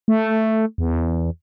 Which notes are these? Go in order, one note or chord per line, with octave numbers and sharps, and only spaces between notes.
A3
E2